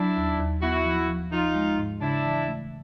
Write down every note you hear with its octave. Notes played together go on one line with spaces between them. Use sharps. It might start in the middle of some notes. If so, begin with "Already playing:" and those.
Already playing: F#3 D4 E4
D#2
D#2
B3 E4 F#4
F3
F3
F3 D#4 F4
G#3
G#2
C#3 D4 E4
E3
A3